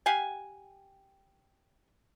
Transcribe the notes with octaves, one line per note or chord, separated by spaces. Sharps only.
G4 F5 F#5 G#5